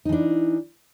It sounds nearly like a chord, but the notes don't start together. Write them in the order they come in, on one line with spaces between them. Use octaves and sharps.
D#4 E3 D4